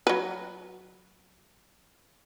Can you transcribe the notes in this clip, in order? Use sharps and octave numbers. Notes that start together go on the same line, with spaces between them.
F#3 B4